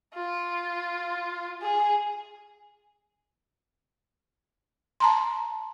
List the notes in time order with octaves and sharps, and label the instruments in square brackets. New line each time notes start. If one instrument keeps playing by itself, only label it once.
[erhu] F4
G#4
[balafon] A5 A#5 C6